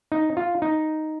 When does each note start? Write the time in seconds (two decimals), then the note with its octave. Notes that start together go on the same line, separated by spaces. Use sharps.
0.12 D#4
0.37 F4
0.62 D#4